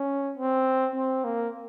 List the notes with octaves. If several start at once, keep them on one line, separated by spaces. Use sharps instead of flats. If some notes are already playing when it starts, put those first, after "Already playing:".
Already playing: C#4
C4
C4
A#3